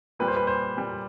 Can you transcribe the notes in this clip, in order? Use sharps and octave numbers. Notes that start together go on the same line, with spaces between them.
A#2 G3 B4
C5
B4
C5
A#2 G3